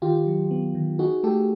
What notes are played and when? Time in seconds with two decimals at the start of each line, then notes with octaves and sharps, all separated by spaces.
0.02 D#3 F4 G4
0.27 F#3
0.51 B3
0.75 D#3
0.99 D#4 F#4 G#4
1.23 A3 G4 A4